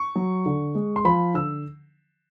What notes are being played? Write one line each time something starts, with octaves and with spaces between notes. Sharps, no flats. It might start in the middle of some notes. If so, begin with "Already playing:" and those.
Already playing: C#6
F#3
D3
G#3
C6
F3 B5
D3 E6